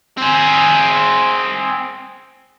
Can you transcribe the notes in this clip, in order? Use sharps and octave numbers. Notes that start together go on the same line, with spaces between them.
C4 G#4